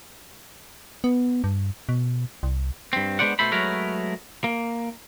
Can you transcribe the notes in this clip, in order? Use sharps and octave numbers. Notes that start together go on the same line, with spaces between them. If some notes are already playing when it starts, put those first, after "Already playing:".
B3
G2
B2
C2
G2 C4
G#3 B3 D4 C5 D5 F#5
B2 A3 A4 C5 B5
F#3 G#3 A3 A#4 B4 C#5
A#3